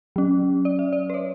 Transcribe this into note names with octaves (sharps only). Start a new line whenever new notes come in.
F#3 C#4
D5
E5
D5
B4
C#5